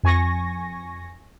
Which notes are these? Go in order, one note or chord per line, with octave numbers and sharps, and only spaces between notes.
F2 G#5 C#6 A#6